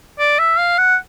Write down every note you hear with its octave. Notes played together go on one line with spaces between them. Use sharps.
D5
E5
F5
F#5